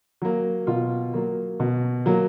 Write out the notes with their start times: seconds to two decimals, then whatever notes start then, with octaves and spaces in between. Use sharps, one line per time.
0.22 F#3 A#3
0.67 B2 F4
1.14 F#3 A#3
1.60 B2
2.06 F#3 A#3